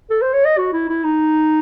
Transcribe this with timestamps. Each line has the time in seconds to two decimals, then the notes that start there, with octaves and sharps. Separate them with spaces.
0.10 A4
0.22 C5
0.33 C#5
0.45 D#5
0.57 F#4
0.73 E4
0.89 E4
1.03 D#4